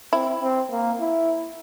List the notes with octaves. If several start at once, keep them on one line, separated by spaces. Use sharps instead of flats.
C4 E4
C4
A#3
E4